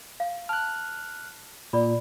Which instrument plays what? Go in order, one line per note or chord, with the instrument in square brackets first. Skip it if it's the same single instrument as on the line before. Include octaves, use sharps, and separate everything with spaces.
[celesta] F5
[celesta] A5 [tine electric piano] F6 F#6
[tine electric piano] A#2 [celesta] D5 B5